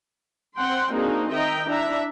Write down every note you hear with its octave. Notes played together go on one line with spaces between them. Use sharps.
C4 F#5 G5 C6
A#3 C4 D4 D#4 F#4 G#4
D#3 D#5 E5 G5 A#5
D4 E4 E5 A#5